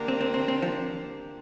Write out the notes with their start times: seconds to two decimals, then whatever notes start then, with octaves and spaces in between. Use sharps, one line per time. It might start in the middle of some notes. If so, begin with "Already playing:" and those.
Already playing: D3 A#3 D4 G4 A#4
0.08 C4
0.21 C4
0.34 C4
0.48 C4
0.62 F3